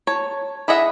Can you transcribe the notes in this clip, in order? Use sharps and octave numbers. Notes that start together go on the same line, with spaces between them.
C#5 A5
E4 G#4 D#5 E5 F#5